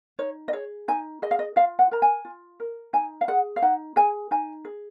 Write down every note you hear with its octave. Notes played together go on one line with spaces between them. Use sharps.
D#4 C#5
D#5
G#4 C#5
D#4 G#5
G#4 D#5
F5
D#5
F4 F5
F#5
A#4 A#5
G#5
F4
A#4
D#4 G#5
F5
G#4 F#5
F5
D#4 F#5
G#4 G#5
D#4 G#5
G#4